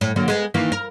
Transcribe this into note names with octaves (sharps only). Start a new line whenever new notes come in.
A2
D3 F#3 A#3
G#3 A#3 B3
D#3 E3 A#3
A#4